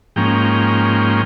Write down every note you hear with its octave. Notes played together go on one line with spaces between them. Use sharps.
G#2 F3 A#3 C#4 G5